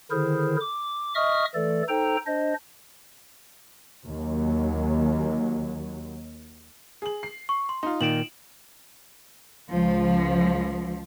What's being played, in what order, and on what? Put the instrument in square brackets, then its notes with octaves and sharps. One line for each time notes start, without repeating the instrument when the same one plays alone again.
[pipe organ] D3 D#3 E4 G#4 A#4 C5
D6
D#5 E5 C#6 D#6 F6
E3 A3 A4 D5
D#4 A4 C5 G5 A#5
D4 C5 D#5
[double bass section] D#2 F#3
[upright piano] G#4 F#7
C7
[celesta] C#6
C6
[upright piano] D#4 F4 [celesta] C6
[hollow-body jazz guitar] A#2 D#3 [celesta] D7 E7 F#7
[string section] C#2 F3